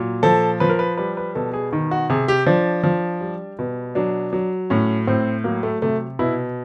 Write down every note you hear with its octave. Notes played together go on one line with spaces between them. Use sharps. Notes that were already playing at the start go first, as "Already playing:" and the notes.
Already playing: A#2 F#3
F3 A4
F3 B4
A#4
B4
G3 B4
B4
B2 A4
G#4
D#3
F#4
C3 G#4
G4
F3 D4
F3
G3
B2
F#3 D4
F#3
A2 C#4
A2 C4
F#3 A#3
A3
C3 A3
B2 E4